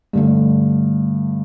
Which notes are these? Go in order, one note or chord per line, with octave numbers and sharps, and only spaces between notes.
G2 D3 A3